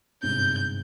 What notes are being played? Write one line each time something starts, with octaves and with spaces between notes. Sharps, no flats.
G1 G#2 C3 G6